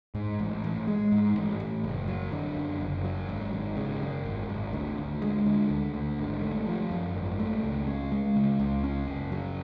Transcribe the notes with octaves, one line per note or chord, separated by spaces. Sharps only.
G#2
A1
A1
G#3
G#2
A1
A1
F#1
F#3
D3
F#2
F#1
F#3
G#1
G#1
C#3
F#2
G#1
G#1
D2
D2
G#3
D3
D2
D2
G#1
A3
F3
F#2
G#1
A3
C#2
C#4
G#3
C#3
C#2
C#4
F#1
F#3